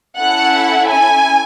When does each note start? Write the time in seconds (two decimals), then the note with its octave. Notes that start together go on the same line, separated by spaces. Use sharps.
0.20 C#4 E4 A4 F#5
0.91 G#5